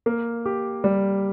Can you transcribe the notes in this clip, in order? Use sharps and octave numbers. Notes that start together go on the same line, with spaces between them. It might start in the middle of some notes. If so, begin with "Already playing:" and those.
A#3
G4
G3